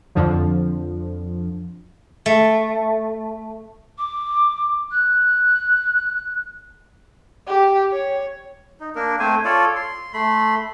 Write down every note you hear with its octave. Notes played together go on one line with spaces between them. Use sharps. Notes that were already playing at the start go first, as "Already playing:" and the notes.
F2 D3 F3
A3
D6
F#6
G4
C#5
D#4
A#3 D4 A#4
A3 C4 C5 G#5
F4 A4 C#5 D5
C6
A3 B5 C6